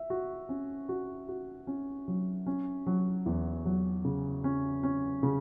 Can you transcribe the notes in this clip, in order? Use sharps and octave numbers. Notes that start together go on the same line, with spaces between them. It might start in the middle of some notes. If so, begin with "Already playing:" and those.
Already playing: E5
F#4
C#4
F#4
F#4
C#4
F#3
C#4
F#3
E2
F#3
C#3
C#4
C#4
C#3